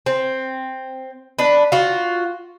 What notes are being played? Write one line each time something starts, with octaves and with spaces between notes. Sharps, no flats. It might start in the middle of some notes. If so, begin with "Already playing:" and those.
C4
D4 B4
F4 F#4